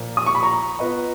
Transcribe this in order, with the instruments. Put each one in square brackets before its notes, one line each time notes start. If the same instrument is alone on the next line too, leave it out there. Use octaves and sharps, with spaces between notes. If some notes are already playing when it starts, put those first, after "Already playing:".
Already playing: [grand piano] A#2 F3 A#3
[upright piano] D#6
C#6
B5
A#5 C#6
[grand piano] B3 F4 B4 D#5